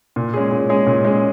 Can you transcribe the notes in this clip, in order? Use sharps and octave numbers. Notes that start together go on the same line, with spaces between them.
A#2
G#3 C#4 G#4
A#2
G#3 C#4 G#4
A#2
G#3 C#4 G#4